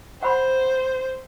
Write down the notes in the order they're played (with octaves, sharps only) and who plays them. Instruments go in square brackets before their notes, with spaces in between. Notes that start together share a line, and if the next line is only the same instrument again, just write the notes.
[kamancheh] C5 [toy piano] F#5 B5 C6